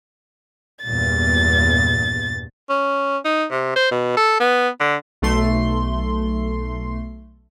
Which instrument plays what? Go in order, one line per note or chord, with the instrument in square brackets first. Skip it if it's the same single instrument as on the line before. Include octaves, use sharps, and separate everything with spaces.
[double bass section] E2 G2 A#2 [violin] A6
[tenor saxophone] C#4
D#4
C3
C5
B2
A4
B3
D3
[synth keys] B1 A3 C6